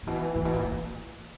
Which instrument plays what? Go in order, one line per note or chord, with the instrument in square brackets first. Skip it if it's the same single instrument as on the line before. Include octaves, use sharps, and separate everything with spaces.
[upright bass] A#2
[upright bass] B2 [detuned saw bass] E3
[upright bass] A#2
B2
A#2
A#2